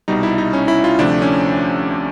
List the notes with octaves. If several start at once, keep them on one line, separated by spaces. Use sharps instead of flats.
C2 B2 G3 D#4
E4
D#4
C#4
E4
F4
D2 C3 F3 A3 D4
C#4